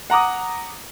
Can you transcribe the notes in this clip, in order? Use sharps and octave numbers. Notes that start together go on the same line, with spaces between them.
F#5 A#5 D6 D#6